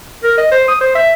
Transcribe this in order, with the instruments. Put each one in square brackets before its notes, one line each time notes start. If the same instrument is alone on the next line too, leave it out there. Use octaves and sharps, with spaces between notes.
[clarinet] A#4
D#5
C5
D#6
C5
E5